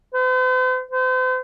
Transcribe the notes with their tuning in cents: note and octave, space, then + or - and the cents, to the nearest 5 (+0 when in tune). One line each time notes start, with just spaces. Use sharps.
C5 -45
C5 -40